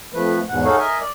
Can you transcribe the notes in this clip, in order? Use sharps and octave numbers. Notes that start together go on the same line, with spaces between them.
F2 F3 A3 B4
E2 G#2 B2 F#5
D#4 F#4 G#4 A4 C#5 F5
A#4 D#5 E5 G#5
D5